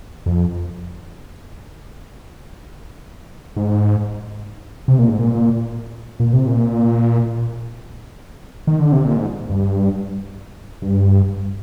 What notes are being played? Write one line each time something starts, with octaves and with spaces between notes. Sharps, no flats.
F2
G#2
C3
A#2
G#2
A#2
A#2
C3
A#2
D#3
D3
C3
A#2
G#2
G2
G2